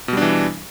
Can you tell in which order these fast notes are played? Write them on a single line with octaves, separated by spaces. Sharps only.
B2 G3 D4 E3